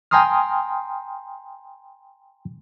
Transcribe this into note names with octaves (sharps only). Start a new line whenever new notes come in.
G5 G#5 A#5 C6 D#6 F6